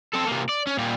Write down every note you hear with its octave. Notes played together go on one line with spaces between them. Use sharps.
C4 A4
C3 A#3
D5
C#4
A#2 G3